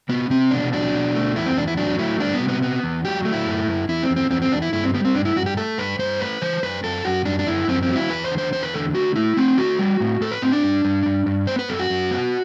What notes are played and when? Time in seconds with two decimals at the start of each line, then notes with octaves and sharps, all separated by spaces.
0.09 C3 B3
0.30 C3 C4
0.51 B2 D4
0.72 F#3 D4
0.94 B2
1.15 A3
1.36 E2 E4
1.46 C4
1.57 E2 D4
1.68 E4
1.77 F#3 D4
1.98 A3 E4
2.20 G3 D4
2.34 B3
2.41 C3
2.48 B3
2.63 B3
2.83 E2
3.05 F#3 G4
3.25 A3
3.33 E4
3.46 F#2
3.67 F#2
3.89 E2 E4
4.03 C4
4.10 E2
4.16 C4
4.30 E2 C4
4.42 C4
4.52 E2 D4
4.62 E4
4.73 G2 E4
4.84 C4
4.94 G3 B3
5.05 C4
5.15 G2 D4
5.25 E4
5.36 G2 F#4
5.46 G4
5.57 A3 A4
5.78 G2 B4
5.99 G2 C5
6.20 A3 B4
6.42 E3 C5
6.63 F#2 B4
6.84 F#2 A4
7.05 F#2 F#4
7.25 F#2 D4
7.39 D4
7.47 F#2 E4
7.68 F#2 C4
7.83 C4
7.89 F#3
7.96 E4
8.10 E2 B4
8.24 C5
8.31 D3
8.38 C5
8.53 E2 C5
8.63 B4
8.74 D3 A4
8.95 A3 F#4
9.16 A3 E4
9.37 A3 C4
9.57 A3 F#4
9.79 G3
10.00 A2
10.21 A2 A4
10.31 B4
10.42 A2 C4
10.52 D4
10.63 G2
10.85 G2
11.06 G2
11.26 G2
11.47 B3 C5
11.59 B4
11.68 F#2 A4
11.79 F#4
11.90 F#2
12.11 B3